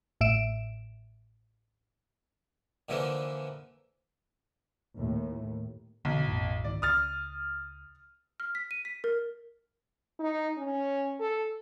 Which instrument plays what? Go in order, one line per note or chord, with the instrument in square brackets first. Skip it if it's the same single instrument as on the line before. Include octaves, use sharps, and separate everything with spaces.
[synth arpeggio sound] A1 A2 E5 D7 E7
[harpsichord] A#2 D3 E3 F3 A#3
[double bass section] D#2 A2
[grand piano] B1 [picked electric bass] D3 E3
[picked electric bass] A1 F2 A2
[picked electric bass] C2 G#2 D#3 [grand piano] D5
[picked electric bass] C#2 [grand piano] D#6 F6 A6
[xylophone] F6
B6
D#7
B6
A#4
[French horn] D#4
C#4
A4